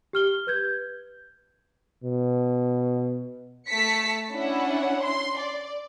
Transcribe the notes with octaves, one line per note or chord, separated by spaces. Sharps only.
G4 F6 G7
B4 G6 G#6
B2
A3 A5 B6 C#7
C#4 D4 E4 F#5
C6
D5